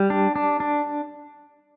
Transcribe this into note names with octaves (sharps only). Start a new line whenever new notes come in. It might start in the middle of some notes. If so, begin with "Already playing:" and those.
Already playing: G3
D4
D4
D4